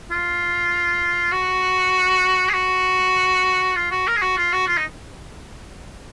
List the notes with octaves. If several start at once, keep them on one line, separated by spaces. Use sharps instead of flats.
F4
F#4
G#4
F#4
F4
F#4
A#4
G#4
F#4
F4
F#4
F4
D#4